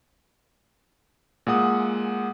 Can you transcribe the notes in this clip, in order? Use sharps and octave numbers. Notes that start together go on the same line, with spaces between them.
A#2 G#3 F#5 D#6